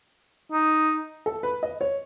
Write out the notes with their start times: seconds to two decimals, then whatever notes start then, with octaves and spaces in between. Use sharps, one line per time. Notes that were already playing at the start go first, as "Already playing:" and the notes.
0.52 D#4
1.26 A4
1.43 B4
1.63 D#5
1.81 C#5